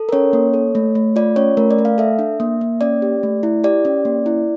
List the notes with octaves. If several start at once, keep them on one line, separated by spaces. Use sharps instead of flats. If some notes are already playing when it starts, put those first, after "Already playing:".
Already playing: A4
A#4
C#4 C#5
A#3
A4
A3
A3
F4 D5
C#4 C#5
A3 A#4
D5
A3
F5
A4 E5
D4
A#3
A#3
C#4 D5
G4
A3
E4
G4 D5
C#4
A#3
E4